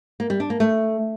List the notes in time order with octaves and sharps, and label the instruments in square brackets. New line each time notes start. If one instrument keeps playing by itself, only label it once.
[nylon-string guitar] A#3
G3
D4
A#3
A3